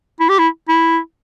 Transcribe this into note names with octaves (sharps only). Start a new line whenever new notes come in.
E4
G4
E4
E4